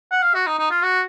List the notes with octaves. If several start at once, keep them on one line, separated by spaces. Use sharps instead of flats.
F#5
F5
F#4
D#4
D#4
F4
F#4